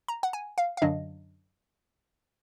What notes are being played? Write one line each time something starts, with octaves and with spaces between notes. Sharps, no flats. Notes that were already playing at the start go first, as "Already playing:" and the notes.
A#5
F#5
G#5
F5
F5
F#2 D3 F#3 D4 D#5